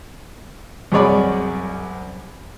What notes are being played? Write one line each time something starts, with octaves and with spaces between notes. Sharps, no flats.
C2 F#2 G#4 C#5 D5 B5